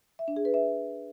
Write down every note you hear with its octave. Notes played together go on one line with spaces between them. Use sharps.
E5
D4
G#4
B4
E5